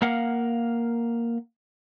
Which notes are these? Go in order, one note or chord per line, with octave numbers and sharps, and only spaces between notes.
A#3 A#4 F5 F#5